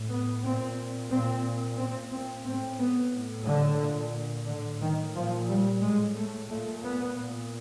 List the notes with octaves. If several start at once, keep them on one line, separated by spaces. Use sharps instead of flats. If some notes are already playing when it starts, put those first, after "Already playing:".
Already playing: A2
B3
A#2 C4
A#2 C4
A#2 C4
C4
A2 C4
B3
A2
D3
A#2
A2 D3
D#3
A#2 F3
G3
A2 G#3
A3
A#2 A3
B3
A#2